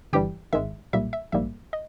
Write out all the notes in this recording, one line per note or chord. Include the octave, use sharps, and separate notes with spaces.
G1 G2 E3 G3 G4 G5
G#1 G#2 D#3 G#3 E5
B1 A#2 G3 A#3 E5
E5
A#1 G#2 G3 A#3 E5
D#5